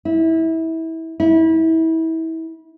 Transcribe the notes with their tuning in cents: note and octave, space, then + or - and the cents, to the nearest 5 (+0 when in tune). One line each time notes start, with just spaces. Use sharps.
E4 -25
E4 -30